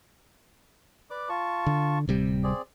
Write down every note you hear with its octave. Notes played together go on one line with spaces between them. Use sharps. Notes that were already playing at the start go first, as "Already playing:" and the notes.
B4 D5 D6
F4 A5 C#6
D3
D1 C3 G3
C4 G#4 D5